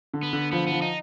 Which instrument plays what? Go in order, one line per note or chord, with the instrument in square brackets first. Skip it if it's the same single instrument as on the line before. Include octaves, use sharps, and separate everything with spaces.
[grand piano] D3
[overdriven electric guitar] B3
[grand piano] D3
[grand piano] F3 [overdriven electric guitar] B3
[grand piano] F3 [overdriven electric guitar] B3
[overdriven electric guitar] D#4